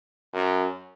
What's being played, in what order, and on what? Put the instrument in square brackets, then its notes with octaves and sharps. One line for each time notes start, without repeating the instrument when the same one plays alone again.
[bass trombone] F#2